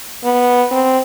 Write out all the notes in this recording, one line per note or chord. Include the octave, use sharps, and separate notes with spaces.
B3
C4